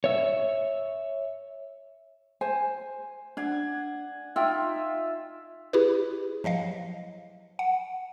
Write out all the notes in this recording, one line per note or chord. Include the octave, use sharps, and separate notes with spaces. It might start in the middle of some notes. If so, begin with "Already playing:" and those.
C#5 E5
C5 G#5
D4 F#5 G#5
D#4 F4 E5 G5
E4 G4 G#4 B4
F3 F#3 D#5 F5
F#5